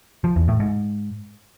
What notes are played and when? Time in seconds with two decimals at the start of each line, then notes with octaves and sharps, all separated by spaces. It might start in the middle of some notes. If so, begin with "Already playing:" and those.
0.24 F3
0.36 E2
0.48 A2
0.60 G#2